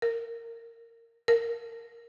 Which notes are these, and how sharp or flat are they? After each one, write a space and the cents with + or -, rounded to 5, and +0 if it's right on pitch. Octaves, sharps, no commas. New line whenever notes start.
A#4 -15
A#4 -10